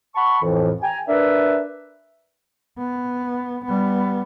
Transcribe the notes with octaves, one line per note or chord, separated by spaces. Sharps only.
F#5 A5 B5 C#6
F2 A2 E3
G5 G#5 A#5
D4 A#4 B4 E5
B3
G3 B3